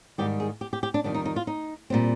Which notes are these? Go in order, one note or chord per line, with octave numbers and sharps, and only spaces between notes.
G#2 D#3 G3 G4
G#4
G4
G4
G4
D4
F2 D#3 G3 D4
D#4
D#4
F4
D#4
A#2 G3 C4